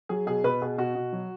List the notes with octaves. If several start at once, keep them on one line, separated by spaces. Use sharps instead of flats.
F#3 G#4
B2 G#4
B2 B4
B2 G#4
B2 F#4
B2
F#3